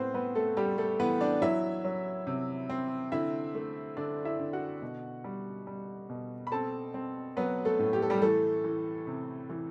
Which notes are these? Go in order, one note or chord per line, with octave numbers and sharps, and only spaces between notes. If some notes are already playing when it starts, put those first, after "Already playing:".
Already playing: A2 B3 C4 B4 C5
B3 C4 B4
A3 A4
G3 A3 G4
A3 A4
E3 B3 B4
D4 D5
F#3 E4 E5
F#3
C3
C4
D3 E4 E5
A3
D3 D4 D5
E4 E5
D3
F#4 F#5
B2
G3
G3
B2
B5
C4 A4 A5
C4
F#3 B3 B4
A3 A4
A2
G4
A4
G3 G4
E3 A3 A4
E3
C3
E3